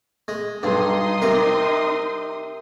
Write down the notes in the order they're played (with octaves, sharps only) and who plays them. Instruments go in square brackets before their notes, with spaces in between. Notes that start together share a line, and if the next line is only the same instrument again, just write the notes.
[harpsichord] G#3
[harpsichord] B1 G2 [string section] D#4 C6 D#6
[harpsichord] C3 A#4